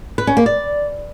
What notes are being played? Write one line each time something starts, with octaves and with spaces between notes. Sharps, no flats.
B4
C#4
A#3
D5